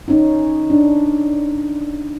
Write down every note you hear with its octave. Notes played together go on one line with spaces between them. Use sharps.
C#4 D#4
D4